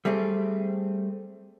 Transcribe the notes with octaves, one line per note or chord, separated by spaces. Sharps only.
G3 A3 C4 G#4